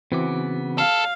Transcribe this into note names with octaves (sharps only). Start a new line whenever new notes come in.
C#3 E3 B3 C4 F#4 D6
A4 F5